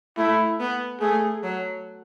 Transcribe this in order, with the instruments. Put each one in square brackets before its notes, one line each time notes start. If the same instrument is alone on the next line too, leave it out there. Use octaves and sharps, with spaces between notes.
[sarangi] A3 [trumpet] E4
[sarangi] B3
[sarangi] A3 [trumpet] G#4
[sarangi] F#3